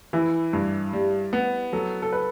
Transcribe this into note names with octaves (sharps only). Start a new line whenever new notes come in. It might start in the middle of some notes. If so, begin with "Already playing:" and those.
E3 E4
G2
G3
B3
F#3 A4
A4
B4